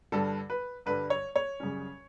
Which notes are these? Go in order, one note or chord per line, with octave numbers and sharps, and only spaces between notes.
G2 D3 G3 A4
B4
G2 D3 G3 B4
C#5
C#5
F#2 C#3 G3 C#4